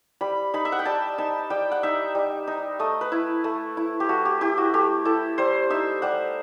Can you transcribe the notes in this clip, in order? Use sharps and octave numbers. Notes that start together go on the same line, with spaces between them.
G3 B5
D#4 B5
E5
F#5
G5
G3 A5
D#4 A5
G3 G5
F#5
D#4 E5
G3
D#4
A3 D#5
B4
E4
A3
E4
G4
A3 F#4
G4
E4 G4
F#4
A3 G4
E4 A4
G3 C5
D#4 E5
G3 F#5